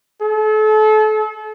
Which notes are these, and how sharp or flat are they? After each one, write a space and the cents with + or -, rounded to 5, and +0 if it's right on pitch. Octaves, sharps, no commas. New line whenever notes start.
A4 -35